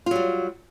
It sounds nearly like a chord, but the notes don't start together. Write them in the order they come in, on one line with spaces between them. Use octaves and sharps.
F4 F#3 G3